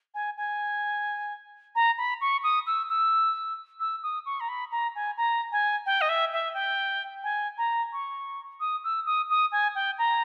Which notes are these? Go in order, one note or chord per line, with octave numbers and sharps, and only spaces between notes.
G#5
G#5
A#5
B5
C#6
D#6
E6
E6
E6
D#6
C#6
A#5
B5
A#5
G#5
A#5
G#5
G5
D#5
E5
E5
G5
G#5
A#5
C#6
D#6
E6
D#6
D#6
G#5
G5
A#5